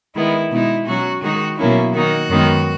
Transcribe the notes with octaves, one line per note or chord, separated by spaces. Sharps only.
D#3 G#3 B3 E4
B2 G#3 B3 D#4 E4
B2 F#3 C#4 F#4
D#3 G#3 D#4 F#4
B2 F#3 A#3 C#4 E4
D#3 A#3 D#4 F#4
F#2 D#3 G#3 B3 D#4